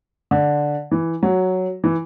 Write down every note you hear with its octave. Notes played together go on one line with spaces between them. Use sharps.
D3
E3
F#3
E3